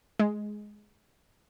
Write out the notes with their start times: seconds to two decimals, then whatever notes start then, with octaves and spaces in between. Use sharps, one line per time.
0.19 G#3